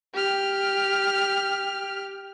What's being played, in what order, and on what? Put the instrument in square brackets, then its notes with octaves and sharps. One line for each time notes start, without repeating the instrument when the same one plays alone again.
[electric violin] G4 F6